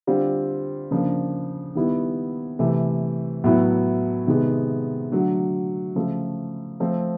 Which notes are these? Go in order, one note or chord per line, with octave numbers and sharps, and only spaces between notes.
D3 G3 C4 F4
C#3 F3 A#3 D4
D#3 G3 B3 E4
C3 E3 A3
A2 F#3 B3 E4
C3 D#3 G#3 B3
D3 F#3 A3
C#3 F3 A3
F3 A3 C4